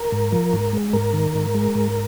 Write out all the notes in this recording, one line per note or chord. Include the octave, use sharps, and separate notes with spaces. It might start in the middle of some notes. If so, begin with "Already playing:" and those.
Already playing: A#4
G#2
F3
G#2
G#3
G#2 A#4
D#3
G#2
G#3
G#2